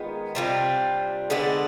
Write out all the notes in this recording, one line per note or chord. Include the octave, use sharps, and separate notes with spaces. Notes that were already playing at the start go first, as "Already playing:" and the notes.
Already playing: D#3 G#3 B3 F4
C3 G3 D4 F4
D3 G#3 B3 D4